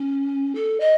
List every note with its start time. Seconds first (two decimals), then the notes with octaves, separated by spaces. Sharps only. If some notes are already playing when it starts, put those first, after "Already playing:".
Already playing: C#4
0.55 A4
0.80 D#5